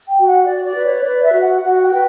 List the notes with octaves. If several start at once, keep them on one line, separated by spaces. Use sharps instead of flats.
G5
F#4
F#5
F#4 D5
D5
B4
C#5
B4 D5
E5
F#4
F#5
F#4 F#5
G5
B4